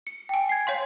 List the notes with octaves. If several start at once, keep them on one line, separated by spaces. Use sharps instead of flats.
C#7
G5 G#5
G#6 C7
C#5 F5 C6